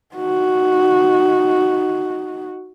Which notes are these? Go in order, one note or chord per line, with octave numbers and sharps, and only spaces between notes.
D#4 F#4